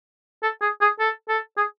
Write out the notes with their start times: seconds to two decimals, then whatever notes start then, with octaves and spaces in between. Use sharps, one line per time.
0.43 A4
0.62 G#4
0.81 G#4
1.00 A4
1.29 A4
1.57 G#4